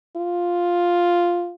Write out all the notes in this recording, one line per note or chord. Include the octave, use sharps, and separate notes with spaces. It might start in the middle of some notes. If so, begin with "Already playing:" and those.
F4